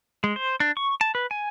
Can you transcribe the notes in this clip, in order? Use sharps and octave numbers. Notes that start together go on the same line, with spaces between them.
G#3
C5
D4
C#6
A5
B4
G#5